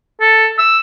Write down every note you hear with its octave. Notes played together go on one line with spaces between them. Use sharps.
A4
E6